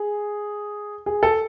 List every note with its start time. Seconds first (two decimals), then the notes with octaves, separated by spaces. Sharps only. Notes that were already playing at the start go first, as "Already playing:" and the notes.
Already playing: G#4
1.06 G#4
1.23 A4